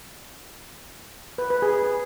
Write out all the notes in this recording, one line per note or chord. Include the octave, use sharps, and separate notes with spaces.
B4
B4
G#4